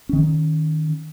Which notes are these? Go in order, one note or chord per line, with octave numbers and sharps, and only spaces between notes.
D#3 C#4